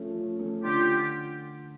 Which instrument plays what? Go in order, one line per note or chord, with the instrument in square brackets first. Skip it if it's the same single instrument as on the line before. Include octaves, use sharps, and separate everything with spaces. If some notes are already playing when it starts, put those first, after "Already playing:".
Already playing: [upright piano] F3 A3 C#4
F3
A3 C#4
[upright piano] D3 [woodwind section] F4 G4